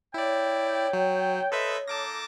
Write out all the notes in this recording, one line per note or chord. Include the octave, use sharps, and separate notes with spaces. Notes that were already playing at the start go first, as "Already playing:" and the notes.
E4 C#5 D5 G5
F#3
A4 B4 C5 D#5 E5
A#3 D#4 A4 A5 D6 A#6